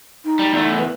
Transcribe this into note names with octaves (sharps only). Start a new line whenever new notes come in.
D#4
G3
E2 A3
B4